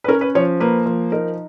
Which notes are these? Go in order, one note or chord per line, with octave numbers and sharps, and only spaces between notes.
B4
C#4 A#4
B4
F3 C#5
A#3 B4
F3
D#4 A#4